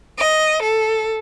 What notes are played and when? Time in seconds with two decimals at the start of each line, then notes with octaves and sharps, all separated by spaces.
0.19 D#5
0.64 A4